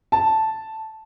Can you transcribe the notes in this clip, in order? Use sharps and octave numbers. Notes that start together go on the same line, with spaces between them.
A5